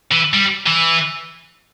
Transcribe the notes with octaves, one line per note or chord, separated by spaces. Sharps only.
E3
G3
E3